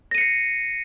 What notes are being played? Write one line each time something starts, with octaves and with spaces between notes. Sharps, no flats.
A#6 C7 C#7 D#7